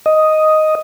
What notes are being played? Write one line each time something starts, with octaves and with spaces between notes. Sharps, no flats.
D#5